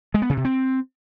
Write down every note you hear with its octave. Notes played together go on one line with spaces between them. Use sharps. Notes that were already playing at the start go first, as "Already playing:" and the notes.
G#3
B3
C#3
C3
C4